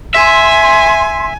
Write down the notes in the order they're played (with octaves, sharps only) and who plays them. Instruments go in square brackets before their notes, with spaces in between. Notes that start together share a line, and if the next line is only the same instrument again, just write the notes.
[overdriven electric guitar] E5 [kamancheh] G#5 [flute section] C6